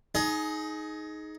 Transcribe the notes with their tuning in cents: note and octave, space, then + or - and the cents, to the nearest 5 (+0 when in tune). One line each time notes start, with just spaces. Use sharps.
D#4 +5 G#4 +25